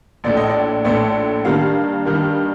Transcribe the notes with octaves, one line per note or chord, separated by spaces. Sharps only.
A#1 A2 A3 D5
D#5
D5
A#1 A2 A3 D5
G2 D#3 G3 A#3 F5
G2 D#3 G3 A#3